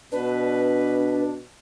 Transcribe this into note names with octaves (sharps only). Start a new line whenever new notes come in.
B2 D4 B4